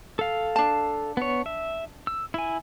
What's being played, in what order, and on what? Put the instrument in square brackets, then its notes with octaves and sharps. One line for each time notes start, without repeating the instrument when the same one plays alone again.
[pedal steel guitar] A4 F5
[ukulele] D4 A5
[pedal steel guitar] B3 C#5
E5
E6
E4 G#5